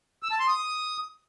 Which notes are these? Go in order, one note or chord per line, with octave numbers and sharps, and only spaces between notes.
E6
A5
C6
D#6